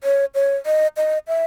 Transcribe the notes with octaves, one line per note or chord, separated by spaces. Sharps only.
C#5
C#5
D#5
D#5
E5